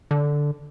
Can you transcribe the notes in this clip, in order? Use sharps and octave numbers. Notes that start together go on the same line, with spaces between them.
D3